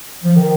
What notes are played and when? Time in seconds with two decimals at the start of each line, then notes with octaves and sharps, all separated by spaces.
0.24 F3
0.36 D#3